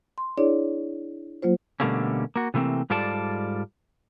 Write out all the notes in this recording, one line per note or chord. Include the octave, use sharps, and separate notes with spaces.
C6
D4 E4 G#4 C#5 D5
F#3 A#3 F4 C5
B2 D3 G3 A3 A#3 C#4
A#3 F#4
C3 E3 A3 A#3 C4
G#2 G3 F4 A4 D5 A5